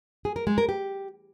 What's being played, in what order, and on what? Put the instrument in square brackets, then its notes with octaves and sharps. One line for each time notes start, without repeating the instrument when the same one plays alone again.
[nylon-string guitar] G#4
A#4
G#3
A#4
G4